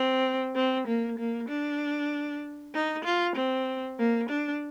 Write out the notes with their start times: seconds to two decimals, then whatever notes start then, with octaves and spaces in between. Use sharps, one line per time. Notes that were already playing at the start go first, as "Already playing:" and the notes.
Already playing: C4
0.55 C4
0.87 A#3
1.18 A#3
1.49 D4
2.74 D#4
3.04 F4
3.36 C4
3.98 A#3
4.29 D4